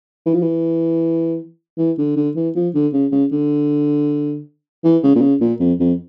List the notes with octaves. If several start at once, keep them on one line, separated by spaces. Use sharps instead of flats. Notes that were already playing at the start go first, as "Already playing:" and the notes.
E3
F3
E3
E3
D3
D3
E3
F3
D3
C#3
C#3
D3
E3
C#3
A#2
C#3
A#2
F2
F2